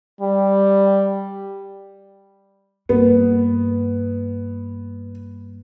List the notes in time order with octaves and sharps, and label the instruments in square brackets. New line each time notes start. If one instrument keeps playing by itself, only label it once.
[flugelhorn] G3
[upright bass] G2 [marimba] A#3 [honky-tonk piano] B3